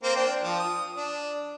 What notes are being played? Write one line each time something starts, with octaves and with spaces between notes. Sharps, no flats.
A#3 C4 C5
D4 G5
F3
D#6
D4